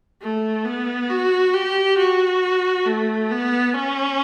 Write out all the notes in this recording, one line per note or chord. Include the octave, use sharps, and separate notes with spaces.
A3
B3
F#4
G4
F#4
A3
B3
C#4